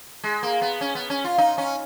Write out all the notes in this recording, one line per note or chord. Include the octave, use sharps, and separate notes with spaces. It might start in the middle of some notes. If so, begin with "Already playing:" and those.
G#3
A#3
B3
C#4
B3
C#4
F4
D#4
C#4